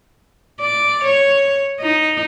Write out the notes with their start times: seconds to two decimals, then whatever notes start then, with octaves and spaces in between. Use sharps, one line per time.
0.60 D5
1.05 C#5
1.80 D#4